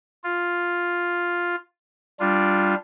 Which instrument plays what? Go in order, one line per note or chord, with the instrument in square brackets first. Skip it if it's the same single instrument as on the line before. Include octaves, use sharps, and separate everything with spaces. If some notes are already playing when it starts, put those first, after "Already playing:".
[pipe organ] F4
G3 D4 F4